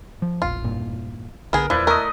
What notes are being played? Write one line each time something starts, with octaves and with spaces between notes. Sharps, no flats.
F3
E1 A#1 F4
E1 G2 A#2
B1 D3 B3 G#4 A#4
D#1 E2 F3 E4 B4 D5
A3 A#4 D#5